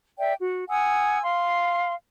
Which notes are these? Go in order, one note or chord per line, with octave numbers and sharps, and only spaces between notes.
D5 E5 G5
F#4
F#5 G#5 D#6 E6
F5 C6